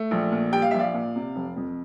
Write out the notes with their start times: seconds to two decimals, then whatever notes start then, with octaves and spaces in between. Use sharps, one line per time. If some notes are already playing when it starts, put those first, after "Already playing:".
Already playing: A3
0.11 A#1
0.32 A#2
0.52 G3 G5
0.62 F5
0.71 A#1 E5
0.79 D5 F5
0.94 A#2
1.16 C3
1.35 F1
1.57 F2